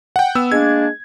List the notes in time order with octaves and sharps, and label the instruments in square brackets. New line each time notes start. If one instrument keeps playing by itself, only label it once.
[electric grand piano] F#5 G5
B3 E6
[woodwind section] G#3 A#3 D4 [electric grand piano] G#6